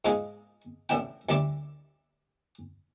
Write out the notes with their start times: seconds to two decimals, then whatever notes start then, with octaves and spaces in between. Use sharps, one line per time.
0.05 G#2 G#3 F4 G#4
0.89 A1 A2 D4 E4 G5
1.29 D2 G3 D4 E4 D5